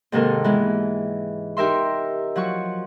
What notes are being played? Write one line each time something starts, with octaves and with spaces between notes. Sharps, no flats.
G#2 C3 D#3 A#3 A4 A#4
E3 G#3 B3
D#4 G4 A#4 E5 C6
F3 F#3 F#4 C#6